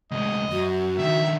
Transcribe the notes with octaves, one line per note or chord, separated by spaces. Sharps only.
D2 G#3 D#5
F#2 F#4
D3 D#3 E5